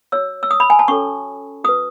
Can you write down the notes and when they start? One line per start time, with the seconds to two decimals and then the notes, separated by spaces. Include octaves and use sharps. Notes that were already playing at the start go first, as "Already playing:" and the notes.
0.12 F#4 C#5 E6
0.43 E6
0.51 D#6
0.60 B5
0.70 G#5
0.79 A5
0.88 C#4 F#4 A4 C#5 C#6
1.64 F#4 B4 D#6